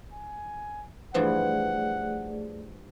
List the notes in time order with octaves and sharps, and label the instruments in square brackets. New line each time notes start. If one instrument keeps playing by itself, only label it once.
[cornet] G#5
[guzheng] G2 E3 F3 [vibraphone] A3 G#4 D5 [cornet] F#5